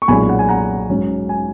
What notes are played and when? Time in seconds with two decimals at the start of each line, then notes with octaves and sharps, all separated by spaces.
0.02 C#6
0.08 B1 A#2 G#3 C#4 G#5 B5
0.29 F#5
0.39 G#5
0.49 F#5 A#5
0.90 G#2 F#3 C#4
1.29 G#5